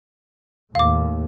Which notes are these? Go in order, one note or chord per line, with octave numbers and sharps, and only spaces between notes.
D#2 A2 F5 D6